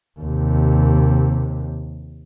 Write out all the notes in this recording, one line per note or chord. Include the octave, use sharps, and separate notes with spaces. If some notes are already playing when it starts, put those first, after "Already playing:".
D#2 C3